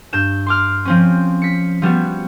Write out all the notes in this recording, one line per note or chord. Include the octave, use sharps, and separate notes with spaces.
G2 G6 E7
C6 D6 F6
F3 C4 C#4
B6 C#7
F3 G3 B3 F#4